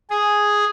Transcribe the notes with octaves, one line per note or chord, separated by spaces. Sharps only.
G#4